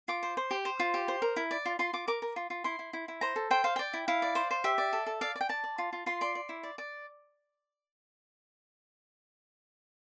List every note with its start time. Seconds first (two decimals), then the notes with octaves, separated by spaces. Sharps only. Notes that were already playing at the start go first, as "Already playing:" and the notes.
0.08 F4 D6
0.23 C5
0.37 C5
0.51 G4
0.65 C5
0.80 F4
0.94 G4
1.08 C5
1.22 A#4
1.36 E4
1.51 D5
1.65 F4
1.79 F4 C6
1.93 F4 D6
2.08 A#4 D6
2.22 A#4
2.36 F4
2.50 F4
2.64 E4 C6
2.79 E4
2.93 E4
3.08 E4
3.21 C5 A#5
3.36 A4
3.51 C5 G5
3.64 C5 F5
3.76 D5 G5
3.93 E4
4.08 E4 F5
4.22 D5
4.35 C5
4.51 C5
4.64 G4 E5
4.78 D5
4.93 A4
5.06 A4
5.21 D5 F5
5.36 D5
5.41 G5
5.49 D5 A5
5.64 D5
5.78 F4
5.93 F4
6.06 F4 C6
6.21 D5 C6
6.35 D5
6.49 E4
6.63 D5
6.78 D5